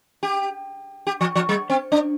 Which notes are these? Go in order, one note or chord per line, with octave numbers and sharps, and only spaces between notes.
G4
G4
F3
F3
G3
C4
D4